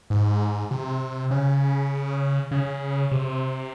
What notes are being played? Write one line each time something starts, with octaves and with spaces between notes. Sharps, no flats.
G#2
C3
C#3
C#3
C3